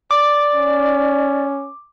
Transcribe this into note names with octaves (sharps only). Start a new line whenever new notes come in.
D5 D6
C#4